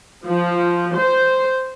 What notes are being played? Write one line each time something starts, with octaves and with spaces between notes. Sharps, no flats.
F3
C5